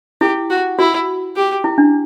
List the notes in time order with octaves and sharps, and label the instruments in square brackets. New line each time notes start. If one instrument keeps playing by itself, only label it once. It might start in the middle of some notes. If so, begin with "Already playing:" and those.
[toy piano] E4 [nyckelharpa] G4
[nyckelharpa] F#4
[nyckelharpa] E4 [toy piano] F#4
[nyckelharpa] G4
[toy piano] E4
D4